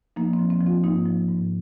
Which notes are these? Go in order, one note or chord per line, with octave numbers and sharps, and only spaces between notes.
F3 A#3 D#4
C4
F3
C4
F3
C4 F4
G#2 A#3 D#4
F3
G#2